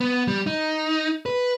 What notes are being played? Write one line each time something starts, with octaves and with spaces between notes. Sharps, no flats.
B3
G3
D#4
B4